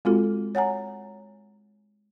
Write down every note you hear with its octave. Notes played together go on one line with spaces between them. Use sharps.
G#3 C4 F4 F#4 A4
C#5 F#5 G#5 A#5